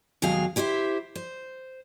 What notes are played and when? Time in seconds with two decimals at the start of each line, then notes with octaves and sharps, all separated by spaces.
0.22 D#2 B2 F#3 G#3 G#4 F5
0.56 E4 G4 C5 D#5 E5
1.15 C5